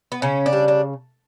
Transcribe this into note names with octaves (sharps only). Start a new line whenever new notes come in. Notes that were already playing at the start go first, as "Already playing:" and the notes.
B3
C#3 C#4
D4
G3
D4